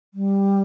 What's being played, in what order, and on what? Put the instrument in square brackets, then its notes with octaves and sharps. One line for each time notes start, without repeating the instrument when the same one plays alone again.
[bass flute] G3